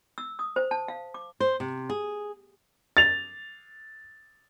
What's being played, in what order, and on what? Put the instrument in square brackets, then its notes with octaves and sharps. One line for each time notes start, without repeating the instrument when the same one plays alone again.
[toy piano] E6
D#6
C5
A5
F5
D6
[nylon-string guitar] C5
C3
G#4
[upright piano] A6 F7